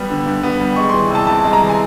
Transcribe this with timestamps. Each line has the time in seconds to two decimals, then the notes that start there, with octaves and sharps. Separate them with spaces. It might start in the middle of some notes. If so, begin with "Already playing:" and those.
Already playing: G3 B3
0.10 D3
0.26 G2
0.43 B3
0.61 G3
0.76 G#3 C#6
0.89 C6
0.94 E3
1.10 C3 A5
1.27 C2 A5
1.44 G#3
1.53 A#5
1.61 E3
1.69 G#5